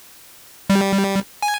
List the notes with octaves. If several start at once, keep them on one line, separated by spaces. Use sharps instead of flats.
G3
G#5